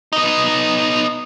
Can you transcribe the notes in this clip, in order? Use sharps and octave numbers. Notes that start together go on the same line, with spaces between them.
B3 D#4